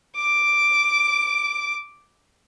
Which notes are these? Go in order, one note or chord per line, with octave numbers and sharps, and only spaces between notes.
D6 D7